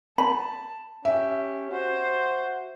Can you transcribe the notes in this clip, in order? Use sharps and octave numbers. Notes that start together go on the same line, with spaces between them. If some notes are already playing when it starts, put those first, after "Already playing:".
A5 B5
C#4 G4 E5
F#4 C5